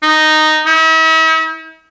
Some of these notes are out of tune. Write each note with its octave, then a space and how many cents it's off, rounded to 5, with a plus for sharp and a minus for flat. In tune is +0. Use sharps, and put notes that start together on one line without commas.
D#4 -5
E4 -45